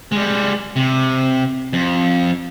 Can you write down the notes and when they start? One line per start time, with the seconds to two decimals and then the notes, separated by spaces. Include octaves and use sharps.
0.12 G3 G#3
0.76 C3
1.73 F2